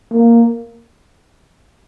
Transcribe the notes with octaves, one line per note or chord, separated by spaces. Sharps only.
A#3